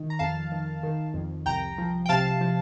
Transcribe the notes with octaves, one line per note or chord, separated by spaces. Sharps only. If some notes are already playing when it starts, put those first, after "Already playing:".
Already playing: D#3
A#5
F2 F5 A5
D#3
D#3
F2
C2 G5 A#5
F3
G5
C3 F5 A5
F3